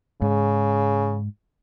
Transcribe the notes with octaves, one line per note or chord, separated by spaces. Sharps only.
G#2 C#3